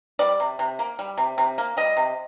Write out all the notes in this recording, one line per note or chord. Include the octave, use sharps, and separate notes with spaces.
G3 D5
C3
C3
A#3
G3
C3
C3
A#3
G3 D#5
C3